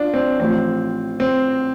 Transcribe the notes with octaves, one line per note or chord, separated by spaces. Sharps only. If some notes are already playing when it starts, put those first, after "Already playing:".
Already playing: D4 F4
C4
A1 A2 F3 C4
C4